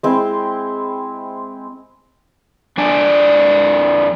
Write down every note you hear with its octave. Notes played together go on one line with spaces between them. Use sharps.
G#3 C4 E4
F2 D4 D5 G#5